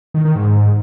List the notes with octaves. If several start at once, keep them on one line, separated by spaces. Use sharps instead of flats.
D#3
D#3
G#2